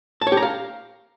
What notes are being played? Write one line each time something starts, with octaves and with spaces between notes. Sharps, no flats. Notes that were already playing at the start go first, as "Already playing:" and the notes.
A5
C#5
G4
A#5
F5